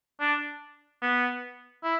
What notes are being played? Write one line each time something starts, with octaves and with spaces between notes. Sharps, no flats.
D4
B3
E4